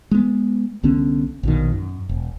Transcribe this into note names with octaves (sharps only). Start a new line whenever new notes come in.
G#3 B3
C2 D3 B3 C#4
A#1 B2 D#3
F#2
E1